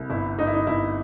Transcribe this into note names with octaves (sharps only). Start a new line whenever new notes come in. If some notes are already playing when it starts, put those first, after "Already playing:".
Already playing: C2
G1 E4
G1 D#4
E4
D#4
G1 E4